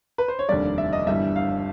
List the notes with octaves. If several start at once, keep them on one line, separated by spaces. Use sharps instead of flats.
B4
C5
C#5
F1 D#2 D3 G3 D5
E5
D#5
G1 G2 E3 G3 E5
F5